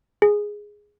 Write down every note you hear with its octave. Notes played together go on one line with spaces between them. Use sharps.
G#4